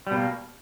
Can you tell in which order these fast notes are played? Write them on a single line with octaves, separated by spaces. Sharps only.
G3 B2 A#3